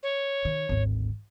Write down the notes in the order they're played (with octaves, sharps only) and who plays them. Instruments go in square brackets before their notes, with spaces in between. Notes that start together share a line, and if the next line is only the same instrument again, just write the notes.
[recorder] C#5
[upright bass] D#3
G#1 D2